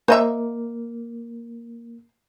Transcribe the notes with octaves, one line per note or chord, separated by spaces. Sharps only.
A#3 C5 D#5 E5